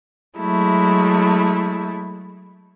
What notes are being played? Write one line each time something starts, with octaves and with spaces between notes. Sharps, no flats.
F#3 G#3 A3 E4